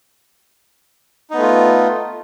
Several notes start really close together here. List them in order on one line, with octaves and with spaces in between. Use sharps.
D#4 B3 A3 F4